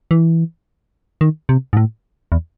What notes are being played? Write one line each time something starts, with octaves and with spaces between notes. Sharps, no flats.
E3
D#3
C3
G#2
A2
E2